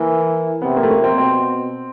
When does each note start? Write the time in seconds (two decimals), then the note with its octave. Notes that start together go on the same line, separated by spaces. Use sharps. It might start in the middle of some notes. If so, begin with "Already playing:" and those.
Already playing: E3 A#3
0.62 C3 B3
0.76 A#3
0.83 A3
0.91 A#3
1.04 C4
1.18 B2 C4